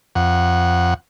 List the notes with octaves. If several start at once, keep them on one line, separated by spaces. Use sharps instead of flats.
F2 F#5